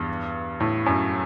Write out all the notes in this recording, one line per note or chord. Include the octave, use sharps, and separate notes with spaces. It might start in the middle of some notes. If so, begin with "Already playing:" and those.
Already playing: E2 G2
A2
F#2